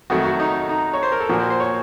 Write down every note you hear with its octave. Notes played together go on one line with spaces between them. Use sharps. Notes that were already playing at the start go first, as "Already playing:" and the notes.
F2 D#3 F#3 A3 F#4
F#4
D#4
D#4
C#5
C5
A#4
A4
A#2 F3 A#3 F#4
C5
C5
C#5